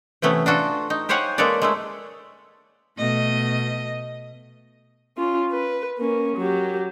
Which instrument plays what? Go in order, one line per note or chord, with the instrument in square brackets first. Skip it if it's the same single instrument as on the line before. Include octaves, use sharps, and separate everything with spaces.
[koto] C3 E3 A3 B3 C#4
D4 F4 F#4 A4
D#4
G4 C5 C#5 F5 F#5 G#5
G#3 A#3 A4 B4 C#5 D5
G#3 A3 E4
[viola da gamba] B2 A3 D#5
[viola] C#4 F4
B4
A#3 C#4
F#3 G4